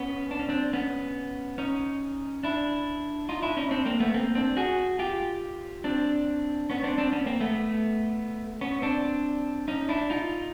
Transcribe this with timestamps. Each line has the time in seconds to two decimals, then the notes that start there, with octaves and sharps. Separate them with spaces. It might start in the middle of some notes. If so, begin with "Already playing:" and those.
Already playing: B3 C#4
0.31 D4
0.39 C#4
0.49 C4 D4
0.73 B3 C#4
1.58 C#4 D#4
2.43 D4 E4
3.29 D#4 F4
3.43 D4 E4
3.57 C#4 D#4
3.71 C4 D4
3.86 A#3 C4
4.00 A3 B3
4.14 A#3 C4
4.35 C4 D4
4.57 F#4 G#4
4.99 F4 G4
5.84 C4 D4
6.70 B3 C#4
6.84 C4 D4
6.98 C4 D4
7.12 B3 C#4
7.26 A#3 C4
7.40 A3 B3
8.61 B3 C#4
8.82 C4 D4
9.68 C#4 D#4
9.89 D4 E4
10.10 D#4 F4